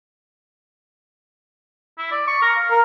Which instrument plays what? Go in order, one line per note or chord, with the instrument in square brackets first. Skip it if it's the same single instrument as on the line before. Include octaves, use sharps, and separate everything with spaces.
[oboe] E4
D5
C#6
A#4
F5
[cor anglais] A#4